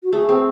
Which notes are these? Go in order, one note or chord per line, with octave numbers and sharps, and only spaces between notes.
F#4
A3 G#4
C4 G#4